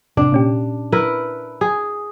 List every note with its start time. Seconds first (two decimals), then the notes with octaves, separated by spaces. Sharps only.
0.17 F#2 A2 C3 D4
0.32 A#2 C#4 G4
0.92 E4 A#4 B4
1.61 G#4